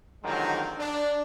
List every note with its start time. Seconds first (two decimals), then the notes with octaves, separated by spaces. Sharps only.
0.23 D3 D#3 F3 F#3 G#3 C4
0.78 D4